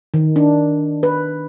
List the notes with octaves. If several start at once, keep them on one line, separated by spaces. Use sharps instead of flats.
D#3
D4
B4